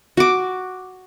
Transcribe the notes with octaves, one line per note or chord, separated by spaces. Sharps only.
F#4 D6